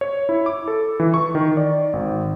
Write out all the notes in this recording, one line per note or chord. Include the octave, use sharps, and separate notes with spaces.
C#5
E4
D6
A4
E3
C#6
D#3
D5
G#1